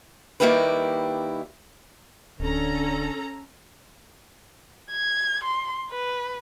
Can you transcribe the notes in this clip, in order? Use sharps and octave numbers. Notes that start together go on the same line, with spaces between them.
D#3 G3 A#3 E4 G4 B4
D1 D3 C#4 A4 A#5
G#6
C6
B4